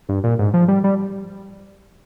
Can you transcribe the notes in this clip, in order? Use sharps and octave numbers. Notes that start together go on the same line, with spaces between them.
G2
A#2
G#2
F3
G3
G3